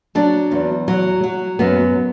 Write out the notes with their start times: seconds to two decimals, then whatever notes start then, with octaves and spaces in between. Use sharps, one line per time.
0.15 F#3 D4
0.51 E2
0.88 F#3
1.24 F#3
1.59 F#2 B3